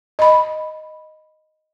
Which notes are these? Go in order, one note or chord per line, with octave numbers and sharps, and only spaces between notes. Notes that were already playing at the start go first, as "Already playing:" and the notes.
D#5 B5